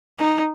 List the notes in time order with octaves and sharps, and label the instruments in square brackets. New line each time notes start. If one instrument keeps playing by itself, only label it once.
[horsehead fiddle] D#4